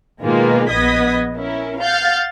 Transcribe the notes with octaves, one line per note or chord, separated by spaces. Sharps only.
B2 D#3 G#3 A#3 F4 B4
A#1 B3 D#5 D#6 G#6 B6
C#4 E4 A#4
F5 F#5 F6 G6 A6